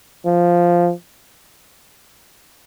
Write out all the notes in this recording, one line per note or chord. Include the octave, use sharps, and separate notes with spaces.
F3